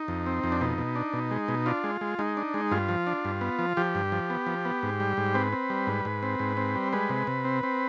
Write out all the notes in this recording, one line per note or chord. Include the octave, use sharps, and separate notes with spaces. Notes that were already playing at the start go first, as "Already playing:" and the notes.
Already playing: D#4
F2
C4
F2
D4
B2 D#4
B2
D4
B2
G#3
B2
D4 F4
G#3
G#3
G#3 D#4
D4
G#3
G2 F4
F3
D4
G2
B3
F3
F3 G4
G2
F3
B3
F3
B3
G#2
G3
G#2
C4 B4
C4
G3
G#2
G#2
C4
G#2
C4
G3
G#3 B4
C3
C3
C4
C4